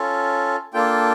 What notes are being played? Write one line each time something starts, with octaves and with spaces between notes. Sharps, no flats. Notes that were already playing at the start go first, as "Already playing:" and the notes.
Already playing: C#4 F4 A4
A#3 D4 F4 A4 G5